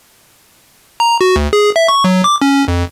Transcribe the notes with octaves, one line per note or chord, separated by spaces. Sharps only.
A#5
F#4
D2
G#4
E5
C#6
F#3
D6
C#4
F2